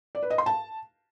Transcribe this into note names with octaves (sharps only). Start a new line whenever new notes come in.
D5
B4
D#5
C6
A5